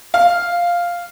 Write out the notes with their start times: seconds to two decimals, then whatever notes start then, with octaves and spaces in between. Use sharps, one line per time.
0.14 F5